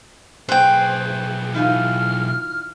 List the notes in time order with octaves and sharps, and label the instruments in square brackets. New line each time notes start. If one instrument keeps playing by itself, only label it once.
[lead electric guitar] B1 G#4 [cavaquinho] B4 G5 [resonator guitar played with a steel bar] C5
[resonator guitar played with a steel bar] E3 D#4 F4 [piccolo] F6